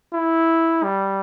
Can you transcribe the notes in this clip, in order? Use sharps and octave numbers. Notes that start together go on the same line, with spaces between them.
E4
G3